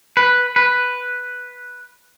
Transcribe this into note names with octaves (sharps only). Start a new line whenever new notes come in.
B4
B4